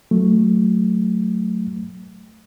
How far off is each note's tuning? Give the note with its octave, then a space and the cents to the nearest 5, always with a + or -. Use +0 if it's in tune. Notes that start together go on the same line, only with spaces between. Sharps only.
F#3 +0 A3 +0